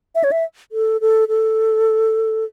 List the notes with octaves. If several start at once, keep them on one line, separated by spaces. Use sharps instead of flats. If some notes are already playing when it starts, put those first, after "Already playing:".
E5
C#5
E5
A4
A4
A4